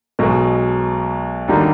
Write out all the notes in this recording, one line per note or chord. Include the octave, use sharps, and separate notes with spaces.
B1 B2 G#3
D#2 D3 G3 A#3 D#4